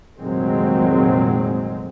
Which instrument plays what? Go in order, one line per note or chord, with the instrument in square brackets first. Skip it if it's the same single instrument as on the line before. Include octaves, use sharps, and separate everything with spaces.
[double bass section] F1 A#2 D#3 F#3 G#3 C4